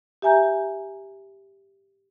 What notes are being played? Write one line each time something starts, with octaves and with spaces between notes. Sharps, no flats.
G4 E5 G#5 A#5 G6